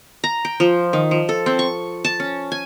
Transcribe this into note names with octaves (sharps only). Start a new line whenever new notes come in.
A#5
G5
F3
D#3
F3
A4
C4
C#6
A5
C#4
G#5